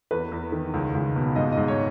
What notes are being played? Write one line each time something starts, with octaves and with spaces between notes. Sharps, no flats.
E2 B4
E2
D#3
C#2
C#2
B2
G#2 D#5
G#2 D#5
C#5